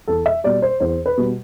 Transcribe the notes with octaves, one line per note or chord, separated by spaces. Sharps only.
E2 A4
E5
B2 G3 D5
C5
E2 C5
B4
B2 G3